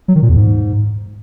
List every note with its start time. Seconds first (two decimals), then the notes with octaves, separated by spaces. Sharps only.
0.08 F#3
0.15 D#3
0.22 A#2
0.30 E2
0.37 G#2